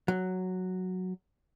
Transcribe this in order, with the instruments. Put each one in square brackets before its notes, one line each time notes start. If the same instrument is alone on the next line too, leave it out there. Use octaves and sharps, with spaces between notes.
[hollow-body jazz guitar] F#3